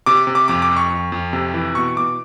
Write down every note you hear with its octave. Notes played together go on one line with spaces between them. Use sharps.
C3 D6
C3
D6
F2 D6
D6
F2
C#6
F2
F2
C3
E3
B2 C#6
B2 D6